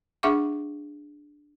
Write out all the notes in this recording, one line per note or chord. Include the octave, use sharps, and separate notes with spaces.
D4 G#4 E5 F#5 C#6 D6